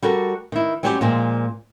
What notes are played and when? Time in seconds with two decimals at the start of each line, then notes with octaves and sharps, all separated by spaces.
0.02 G3 F#4 A4 A#4
0.52 D#3 E4
0.83 F#3 G3 C4 C#4 F#4 G4
1.01 A#2 F3 G#3 C4